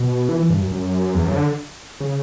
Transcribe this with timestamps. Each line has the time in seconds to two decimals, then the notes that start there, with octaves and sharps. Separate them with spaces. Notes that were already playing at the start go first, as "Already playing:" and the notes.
Already playing: B2
0.29 E3
0.40 E3
0.50 G2
0.61 F#2
0.72 F#2
1.14 E2
1.25 F#2
1.32 C#3
1.36 D3
2.01 C#3